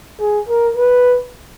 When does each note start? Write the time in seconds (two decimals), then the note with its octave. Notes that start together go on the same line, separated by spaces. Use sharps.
0.20 G#4
0.48 A#4
0.76 B4